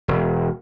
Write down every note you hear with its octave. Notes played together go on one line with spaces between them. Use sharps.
E1